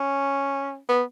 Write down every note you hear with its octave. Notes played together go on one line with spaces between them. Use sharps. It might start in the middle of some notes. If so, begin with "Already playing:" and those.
Already playing: C#4
B3